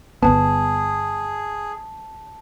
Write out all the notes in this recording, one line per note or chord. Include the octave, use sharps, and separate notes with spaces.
G1 E2 B3 G#4 A5